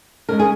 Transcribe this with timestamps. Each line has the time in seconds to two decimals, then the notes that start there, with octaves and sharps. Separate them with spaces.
0.29 C#3 G#3 A#4
0.39 G#4